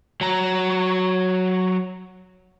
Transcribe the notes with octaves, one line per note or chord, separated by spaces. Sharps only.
F#3 A#5